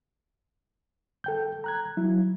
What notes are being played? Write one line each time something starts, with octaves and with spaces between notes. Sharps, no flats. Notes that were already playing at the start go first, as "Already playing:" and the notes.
A4 G5 G6
A#5 F#6 G#6
F#3 E4